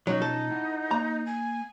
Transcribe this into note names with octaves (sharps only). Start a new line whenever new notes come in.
B2 F#3 C#4 D#4 F4
A4
E4 F#5
A#3 A#5
G#5